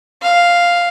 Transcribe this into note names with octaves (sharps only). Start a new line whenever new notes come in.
F5